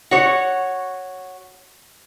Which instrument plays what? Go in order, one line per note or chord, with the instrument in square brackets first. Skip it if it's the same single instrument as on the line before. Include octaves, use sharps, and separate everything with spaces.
[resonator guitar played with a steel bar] F#4 C#5